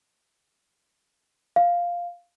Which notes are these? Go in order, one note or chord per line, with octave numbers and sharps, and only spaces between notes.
F5